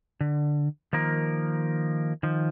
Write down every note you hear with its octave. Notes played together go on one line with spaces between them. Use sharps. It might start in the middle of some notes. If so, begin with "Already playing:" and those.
D3
D#3 F3 A#3 A#4
D#3 F3